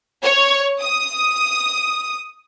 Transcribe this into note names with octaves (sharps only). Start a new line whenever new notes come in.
C#5
D#6